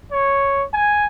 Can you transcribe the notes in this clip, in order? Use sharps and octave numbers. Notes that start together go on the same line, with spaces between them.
C#5
G#5